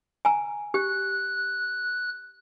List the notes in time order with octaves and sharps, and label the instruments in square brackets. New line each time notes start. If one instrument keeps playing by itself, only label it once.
[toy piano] G#5 A#5
[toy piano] G4 [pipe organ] F#6